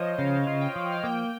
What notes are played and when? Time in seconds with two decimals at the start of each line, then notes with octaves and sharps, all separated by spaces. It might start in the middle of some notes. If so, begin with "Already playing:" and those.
Already playing: F3 C5 C#5 D#5
0.18 C#3 F5
0.47 F4
0.61 G5
0.76 F3
0.92 F5
1.04 A#3 G5